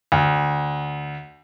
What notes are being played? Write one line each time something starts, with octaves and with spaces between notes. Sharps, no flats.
D2